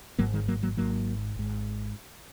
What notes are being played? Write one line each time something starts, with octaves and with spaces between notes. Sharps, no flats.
G#1 G#2 F#3 A#3
D#3 G#3
F#3 A#3
F#3 A#3
G#1 G#2 F#3 A#3
G#1 G#2